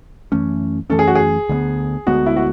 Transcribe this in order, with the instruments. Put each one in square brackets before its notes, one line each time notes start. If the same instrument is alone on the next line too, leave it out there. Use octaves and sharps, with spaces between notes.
[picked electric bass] F#2 E3 A3 C#4
[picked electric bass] F#2 E3 A3 C#4 [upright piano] A4
[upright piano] G#4
F#4
G#4
[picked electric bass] D2 D3 G#3 B3
[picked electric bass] D2 D3 G#3 B3 [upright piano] F#4
[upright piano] E4
F#4